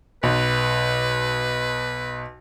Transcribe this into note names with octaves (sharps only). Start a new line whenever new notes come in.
B1 B4